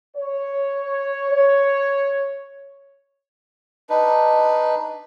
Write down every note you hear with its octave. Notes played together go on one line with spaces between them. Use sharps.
C#5
C#5
D4 D#4 B4